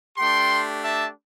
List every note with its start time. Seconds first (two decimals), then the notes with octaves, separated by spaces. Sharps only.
0.17 A3 D4 G4 G5 C6
0.83 E5 A5